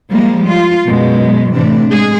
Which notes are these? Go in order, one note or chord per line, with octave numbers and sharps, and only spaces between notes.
F3 G3 G#3 A#3
F4
F#2 B2 G#3
A2 C3 E3 D4
G#3 G#4